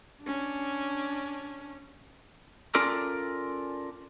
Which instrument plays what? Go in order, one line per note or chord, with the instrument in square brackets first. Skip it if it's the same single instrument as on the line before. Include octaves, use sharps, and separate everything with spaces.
[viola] C#4 D4
[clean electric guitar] C#4 F4 A4 A#4 D5